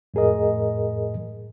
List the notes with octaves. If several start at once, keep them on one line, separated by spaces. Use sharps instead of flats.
F2 A2 G#4 A#4 D#5